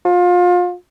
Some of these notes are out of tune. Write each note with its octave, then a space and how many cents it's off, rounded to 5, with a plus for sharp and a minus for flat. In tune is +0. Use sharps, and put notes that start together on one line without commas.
F4 +30